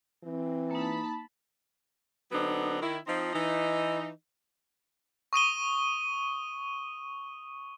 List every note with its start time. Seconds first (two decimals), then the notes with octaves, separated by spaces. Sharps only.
0.23 E3 C4
0.71 A#3 D#4 A5 B5
2.31 D3 F#3 B3 C4 D4 D#4
2.81 D#3 E4
3.06 F3 C4 D#4
3.33 E3 D#4
5.33 C#6 D#6 D#7 G7